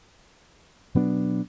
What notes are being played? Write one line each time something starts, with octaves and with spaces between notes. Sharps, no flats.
B2 F#3 B3 D4